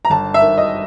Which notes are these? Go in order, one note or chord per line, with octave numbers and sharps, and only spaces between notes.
A#5
G1 A5
E5
D#3
D#5